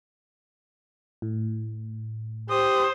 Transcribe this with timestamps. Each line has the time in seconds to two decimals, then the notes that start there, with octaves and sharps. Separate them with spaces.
1.22 A2
2.50 G4 C5 D#6